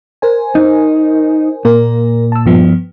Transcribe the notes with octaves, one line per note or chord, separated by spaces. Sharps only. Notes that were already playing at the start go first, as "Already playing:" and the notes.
A#4 C5 G#5
D#4
A#2 A#3 A#4
A5 E6
G2 F3 B3